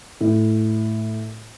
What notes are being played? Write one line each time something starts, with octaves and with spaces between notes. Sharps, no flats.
A2